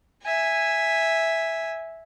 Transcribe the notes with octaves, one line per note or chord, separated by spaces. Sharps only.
E5 G#5